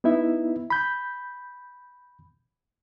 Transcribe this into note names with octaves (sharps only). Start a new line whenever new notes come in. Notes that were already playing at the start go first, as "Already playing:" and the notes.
B3 D#4 E4 E5
B5 G6